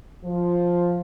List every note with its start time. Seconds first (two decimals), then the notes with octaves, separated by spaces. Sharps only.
0.25 F3